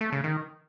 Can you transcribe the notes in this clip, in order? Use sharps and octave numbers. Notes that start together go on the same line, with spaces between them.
A3
C#3
D#3